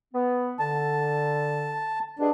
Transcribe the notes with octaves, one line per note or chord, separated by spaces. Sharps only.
B3
D3 A5
G2 B2 D4 G#4